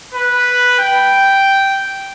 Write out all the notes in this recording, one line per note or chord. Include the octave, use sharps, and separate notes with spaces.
B4
G5